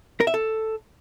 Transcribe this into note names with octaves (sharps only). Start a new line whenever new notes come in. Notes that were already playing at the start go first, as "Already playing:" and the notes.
A#4
E5
A4